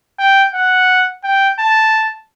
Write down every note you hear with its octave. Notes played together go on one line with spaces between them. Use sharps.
G5
F#5
G5
A5